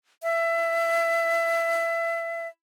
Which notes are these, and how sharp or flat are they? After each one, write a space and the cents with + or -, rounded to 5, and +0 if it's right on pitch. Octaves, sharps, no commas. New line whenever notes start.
E5 +25